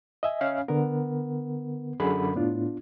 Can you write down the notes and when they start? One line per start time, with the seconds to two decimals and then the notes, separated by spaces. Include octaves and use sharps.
0.23 D#5 E5 G#5
0.41 C#4 F5
0.68 D3 B3 A#4
2.00 F#2 D3 G#4 B5
2.36 A2 B3 D4 F4